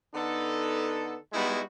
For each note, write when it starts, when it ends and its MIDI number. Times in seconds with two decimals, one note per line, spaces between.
0.15 1.18 50
0.15 1.18 59
0.15 1.18 63
0.15 1.18 69
1.33 1.61 55
1.33 1.61 56
1.33 1.61 59
1.33 1.61 63
1.33 1.61 64
1.33 1.61 66